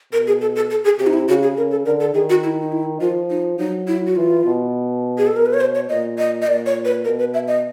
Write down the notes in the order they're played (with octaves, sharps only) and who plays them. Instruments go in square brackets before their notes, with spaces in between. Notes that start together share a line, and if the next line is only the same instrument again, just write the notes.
[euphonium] B2 [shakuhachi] A#4
[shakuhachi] G#4
A4
A4
A4
G#4
[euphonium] C3 [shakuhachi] G4
[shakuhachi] D#4
E4
[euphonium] C#3 [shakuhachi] F#4
[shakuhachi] G#4
[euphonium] C#3 [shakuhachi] A#4
[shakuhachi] A4
[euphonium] D3 [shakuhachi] A#4
[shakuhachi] A4
[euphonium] D#3 [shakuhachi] G#4
[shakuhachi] F#4
E4
D#4
E4
[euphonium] F3 [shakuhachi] F4
[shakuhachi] D#4
[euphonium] F#3 [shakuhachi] D#4
[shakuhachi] E4
F#4
[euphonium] E3 [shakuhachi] F4
[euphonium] B2
[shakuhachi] G#4
A4
[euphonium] B2 [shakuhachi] A#4
[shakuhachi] B4
C#5
C5
C#5
[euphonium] A#2 [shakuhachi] D#5
[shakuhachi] D#5
D#5
[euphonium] A#2 [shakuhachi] D5
[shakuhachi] C#5
B4
[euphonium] B2 [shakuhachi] A#4
[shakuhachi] B4
E5
D#5